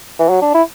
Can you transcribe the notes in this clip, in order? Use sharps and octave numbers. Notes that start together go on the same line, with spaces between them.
E3
F#3
D4
E4